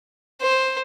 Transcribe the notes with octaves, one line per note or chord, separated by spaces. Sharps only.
C5